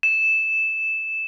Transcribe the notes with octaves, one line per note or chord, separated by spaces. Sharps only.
E7